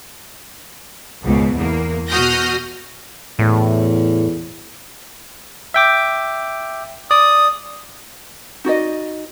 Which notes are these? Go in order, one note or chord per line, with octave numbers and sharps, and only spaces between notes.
C#2 G#2 B2
E2 A#3
B2 F#4 D#6 F6 G6 A#6
E2 A2
E5 G5 D6
D5 D#6
D#4 F#4 D5 D#5